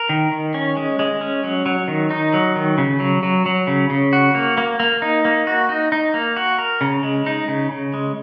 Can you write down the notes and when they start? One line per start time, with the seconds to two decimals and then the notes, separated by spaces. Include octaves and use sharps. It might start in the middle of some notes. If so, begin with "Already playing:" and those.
Already playing: A#4
0.09 D#3
0.32 D#3
0.54 C#4
0.77 G#3
0.99 G#3
1.21 C#4
1.44 F#3
1.66 F#3
1.88 D#3
2.10 D#4
2.33 F#3
2.56 D#3
2.78 C#3
3.00 F#3
3.23 F#3
3.46 F#3
3.67 C#3
3.90 C#3
4.13 F#4
4.35 A#3
4.58 A#3
4.80 A#3
5.02 D#4
5.25 A#3
5.47 F#4
5.69 D#4
5.92 D#4
6.14 A#3
6.36 F#4
6.59 A#4
6.81 C#3
7.03 G#3
7.26 D#4
7.48 C#3
7.71 C#3
7.94 G#3